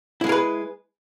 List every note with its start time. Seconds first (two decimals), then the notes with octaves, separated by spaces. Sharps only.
0.21 E4
0.24 G#3
0.27 G#4
0.29 A#4
0.32 B4